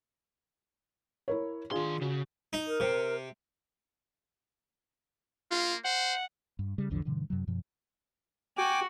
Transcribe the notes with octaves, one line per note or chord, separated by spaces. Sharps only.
E4 A#4 C#5
D#3 D4 F4 G#4 C6
C#3 F#4
D#4
A#4
C3
A#3 F4
C5 F#5
G2
C#3 G3
A#1 E2 D3 F3
G2 B2 D3 E3
F#2 C3 F#3
F#2 B2 F3
F#4 G5 G#5 D6